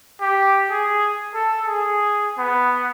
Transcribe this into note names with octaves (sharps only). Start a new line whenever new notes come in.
G4
G#4
A4
G#4
B3